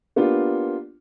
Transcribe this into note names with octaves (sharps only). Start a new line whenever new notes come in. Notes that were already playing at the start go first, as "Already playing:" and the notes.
A#3 B3 D4 F4 G4